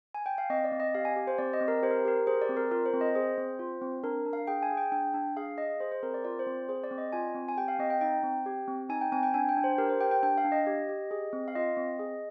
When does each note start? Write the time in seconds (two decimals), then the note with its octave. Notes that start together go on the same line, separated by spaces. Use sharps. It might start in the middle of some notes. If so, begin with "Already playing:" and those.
0.14 G#5
0.26 G5
0.38 F5
0.50 C4 D#5
0.64 D5
0.72 C4
0.80 D#5
0.94 G4 F5
1.05 G#5
1.16 G4
1.27 C5
1.38 C4 D5
1.53 D#5
1.60 C4
1.68 A#4
1.82 G4 C5
1.91 A#4
2.05 G4 A#4
2.27 G#4 C5
2.42 D5
2.49 C4
2.57 A#4
2.71 F4 A#4
2.86 C5
2.93 C4
3.01 D#5
3.15 G#4 C5
3.38 C4
3.59 F4
3.82 C4
4.04 D4 A#4
4.26 D4
4.33 F5
4.47 G#4 G5
4.63 G#5
4.71 G#4
4.77 G5
4.92 D4 G5
5.14 D4
5.36 G#4 F5
5.58 G#4 D#5
5.80 G#4 C5
5.92 C5
6.03 C4 A#4
6.14 D5
6.24 F4 D5
6.39 C5
6.47 C4
6.69 G#4 C5
6.84 D5
6.91 C4
6.98 D#5
7.12 F4 G#5
7.35 C4
7.49 G#5
7.57 G4 G5
7.68 F5
7.79 C4 D#5
7.90 G5
8.01 D#4 G5
8.23 C4
8.46 G4
8.68 C4
8.89 D#4 G#5
9.01 G5
9.12 C4 G#5
9.23 G5
9.34 D4 G#5
9.49 G5
9.56 D4
9.64 C5
9.78 G4 A#4
9.89 C5
10.00 G4 G5
10.11 G5
10.23 D4 G5
10.38 F5
10.45 D4
10.52 D#5
10.67 G4
10.89 G4
11.11 G#4
11.33 C4
11.48 F5
11.55 F4 D#5
11.77 C4
11.99 G#4